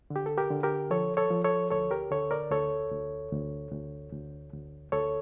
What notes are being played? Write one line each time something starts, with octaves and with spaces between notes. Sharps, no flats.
D3
G4
A4
G4 A#4
D3
G4 A#4
F3 A4 C#5
A4 C#5
F3
A4 C#5
D2 A4 C#5
G4 A#4
D3 A4 C#5
A#4 D5
D2 A4 C#5
D2
D2
D2
D2
D2
D2 A4 C#5